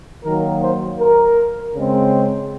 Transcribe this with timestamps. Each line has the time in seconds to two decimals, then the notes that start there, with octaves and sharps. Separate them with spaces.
0.24 D#3 F#3 A#3 A#4
0.61 C5
0.98 A#4
1.75 C#3 G#3 C4